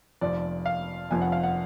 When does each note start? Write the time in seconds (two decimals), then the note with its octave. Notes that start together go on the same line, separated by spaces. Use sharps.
0.21 F1 F2 F3 D5
0.66 F5
1.10 F1 F2 F3 G#5
1.21 F#5
1.32 F5
1.43 F#5